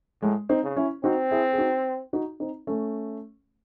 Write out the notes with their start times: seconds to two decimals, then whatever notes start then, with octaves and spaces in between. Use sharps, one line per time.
0.22 A2 G#3
0.49 C4 D#4
0.63 C#3
0.77 C#4 E4
1.04 C4 D#4 F#4
1.31 E4 G#4
1.53 G#4
1.58 D#4 F#4
2.13 D#4 F#4
2.40 C4 D#4
2.67 A3 C#4